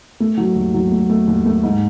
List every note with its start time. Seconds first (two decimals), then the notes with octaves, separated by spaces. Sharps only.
0.20 A3
0.38 F#3
0.56 D#2
0.74 F#3
0.92 A3
1.10 A3
1.27 D#2
1.46 A3
1.63 G#2